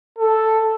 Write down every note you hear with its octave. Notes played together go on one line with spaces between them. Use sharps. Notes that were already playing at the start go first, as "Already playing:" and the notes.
A4